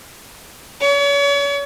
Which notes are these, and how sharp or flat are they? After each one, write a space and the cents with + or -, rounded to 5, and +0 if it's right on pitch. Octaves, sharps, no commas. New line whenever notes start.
C#5 +40